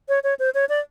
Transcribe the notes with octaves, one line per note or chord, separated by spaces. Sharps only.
C#5
C#5
C5
C#5
D5